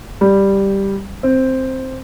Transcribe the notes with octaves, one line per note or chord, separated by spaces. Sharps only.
G3
C4